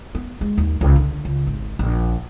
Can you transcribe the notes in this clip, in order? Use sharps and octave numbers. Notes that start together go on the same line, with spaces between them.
B3
G#3
D#2
C#2
D3
C#2
G#1
A#1